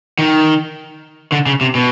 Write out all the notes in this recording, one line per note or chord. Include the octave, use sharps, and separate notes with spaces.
D#3
D3
C#3
C3
B2